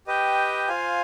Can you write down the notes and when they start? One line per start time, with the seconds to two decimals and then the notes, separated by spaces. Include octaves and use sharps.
0.07 G4 B4 D#5 G5
0.68 F4 C5 F5 G#5